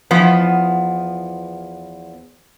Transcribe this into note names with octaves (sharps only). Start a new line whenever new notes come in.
E2 F3 B3